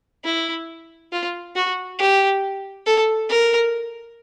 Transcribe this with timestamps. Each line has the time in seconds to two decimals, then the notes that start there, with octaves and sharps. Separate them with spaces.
0.25 E4
1.12 F4
1.55 F#4
1.99 G4
2.86 A4
3.29 A#4